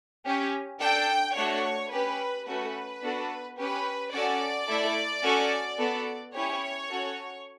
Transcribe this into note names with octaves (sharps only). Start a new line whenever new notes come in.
C#4 G4
D4 A4 G5
A3 D4 F#4 A4 C#5
C#4 G4 B4
A3 C#4 F#4 A4 B4
B3 D4 F#4 A4
C#4 G4 B4
C#4 F#4 A4 D5
A3 E4 A4
C#4 F#4 A4
B3 F#4 A4
C#4 E4 G4 C#5
C#4 F#4 A4